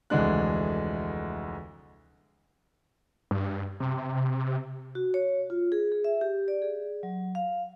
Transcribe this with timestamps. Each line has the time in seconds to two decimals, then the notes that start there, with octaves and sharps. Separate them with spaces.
0.10 F1 D2 E3 G#3 D4 F#6
3.31 G2
3.80 C3
4.95 F#4
5.14 C#5
5.50 F4
5.72 G#4
5.92 G#4
6.04 E5
6.21 G4
6.48 D5
6.62 G#4
7.03 F#3
7.35 F5